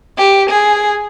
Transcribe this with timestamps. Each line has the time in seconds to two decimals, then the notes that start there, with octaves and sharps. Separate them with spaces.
0.18 G4
0.49 G#4